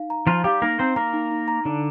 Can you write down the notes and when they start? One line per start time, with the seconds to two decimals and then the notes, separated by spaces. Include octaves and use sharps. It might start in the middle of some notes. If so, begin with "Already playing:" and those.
Already playing: D#4 F5
0.10 A#5
0.27 F3 F4 A#5
0.44 G3 G4 F5
0.62 A#3 D#4 A#4
0.79 C4 C5 A#5
0.96 A#3 A#4 A#5
1.14 D#4
1.31 D#4
1.48 A#5
1.65 D3 D4 D#4